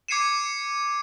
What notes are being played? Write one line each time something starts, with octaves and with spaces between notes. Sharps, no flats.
D6 G#6 C7 C#7 D#7 E7
C#7